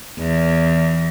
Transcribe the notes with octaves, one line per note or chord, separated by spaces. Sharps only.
E2